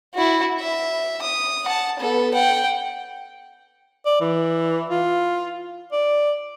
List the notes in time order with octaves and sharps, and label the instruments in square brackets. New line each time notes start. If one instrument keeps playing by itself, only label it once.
[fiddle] E4 F#4
E5
D#6
F#5 A5
B3 A4
F#5 G5
[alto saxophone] D5
E3
F4
D5